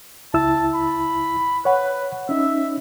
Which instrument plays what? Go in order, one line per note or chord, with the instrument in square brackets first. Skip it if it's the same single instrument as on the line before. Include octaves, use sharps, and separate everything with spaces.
[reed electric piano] C#2 E4 E6 [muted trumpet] A5
[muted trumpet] B5
[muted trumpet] B4 [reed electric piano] C#5 F#5
[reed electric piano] C#4 D#4 [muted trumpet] E5